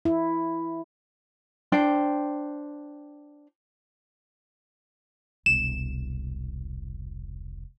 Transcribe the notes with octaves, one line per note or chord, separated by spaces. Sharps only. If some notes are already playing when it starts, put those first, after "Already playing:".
E4
D4 C5 G5
E1 C2 E7